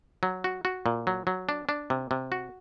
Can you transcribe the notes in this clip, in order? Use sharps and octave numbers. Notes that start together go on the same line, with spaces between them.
F#3
F#4
F#4
A#2
F#3
F#3
D4
D4
C3
C3
F#4